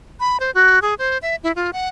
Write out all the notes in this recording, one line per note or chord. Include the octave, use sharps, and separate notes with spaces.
B5
C5
F#4
G#4
C5
E5
E4
F4
F#5